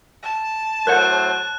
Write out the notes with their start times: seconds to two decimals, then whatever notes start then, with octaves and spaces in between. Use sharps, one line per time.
0.23 A5
0.87 A2 F#3 A#4 C5 C#5 F#5 F#6